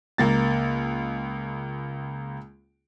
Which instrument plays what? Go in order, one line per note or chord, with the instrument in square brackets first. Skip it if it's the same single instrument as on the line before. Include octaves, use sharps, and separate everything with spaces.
[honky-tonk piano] C#2 A#3 A6